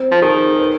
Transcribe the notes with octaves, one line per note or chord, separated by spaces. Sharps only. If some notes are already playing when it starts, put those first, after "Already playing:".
Already playing: C4
F3
D#3 G#4
B4